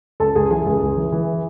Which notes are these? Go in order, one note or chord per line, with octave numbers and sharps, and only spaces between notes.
C#2 A4 A5
C#2 G#4 G#5
E3 G#4 G#5
C#2 G#4 G#5
C#2
E3
E3